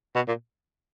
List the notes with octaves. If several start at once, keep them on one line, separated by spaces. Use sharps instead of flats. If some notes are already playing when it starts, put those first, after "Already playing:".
B2
A#2